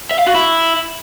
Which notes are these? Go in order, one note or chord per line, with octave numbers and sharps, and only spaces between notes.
E5
F5
F#4
E4